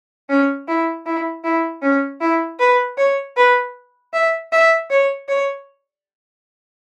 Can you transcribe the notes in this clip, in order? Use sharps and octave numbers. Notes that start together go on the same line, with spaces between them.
C#4
E4
E4
E4
C#4
E4
B4
C#5
B4
E5
E5
C#5
C#5